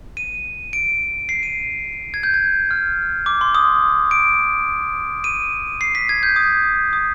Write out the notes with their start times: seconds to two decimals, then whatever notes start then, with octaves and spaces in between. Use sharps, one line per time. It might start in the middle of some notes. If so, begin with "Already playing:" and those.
0.17 D#7
0.73 D7
1.29 C7
1.43 D#7
2.14 G#6
2.23 G6
2.34 G#6
2.71 F6
3.26 D6
3.41 C6
3.55 D#6
4.11 D7
5.24 D#7
5.81 C7
5.95 B6
6.09 G#6
6.23 G6
6.36 D#6
6.93 D#6